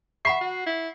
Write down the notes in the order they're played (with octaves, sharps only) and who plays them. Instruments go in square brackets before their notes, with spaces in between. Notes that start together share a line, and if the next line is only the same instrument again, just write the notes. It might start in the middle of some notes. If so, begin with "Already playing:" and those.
[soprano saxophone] E5 [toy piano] F#5 B5 C#6 [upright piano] C7
[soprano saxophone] F#4
E4